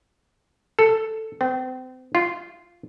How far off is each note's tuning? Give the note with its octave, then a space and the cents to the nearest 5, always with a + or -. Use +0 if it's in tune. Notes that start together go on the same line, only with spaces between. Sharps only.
A4 +5
C4 -35
F4 -10